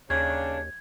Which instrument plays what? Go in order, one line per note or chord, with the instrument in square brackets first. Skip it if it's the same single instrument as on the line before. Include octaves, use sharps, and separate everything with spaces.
[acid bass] D#2 [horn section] C#3 D4 [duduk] C#5 [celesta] G#6